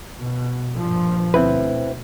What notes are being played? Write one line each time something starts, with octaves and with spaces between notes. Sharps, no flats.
B2
G2 A#2 F3
D2 B2 C4 E4 B4